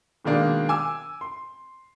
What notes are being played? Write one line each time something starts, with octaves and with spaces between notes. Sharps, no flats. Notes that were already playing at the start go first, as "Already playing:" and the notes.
B2 D#3 G#3 A#3 D4
G#5 D6 E6
C6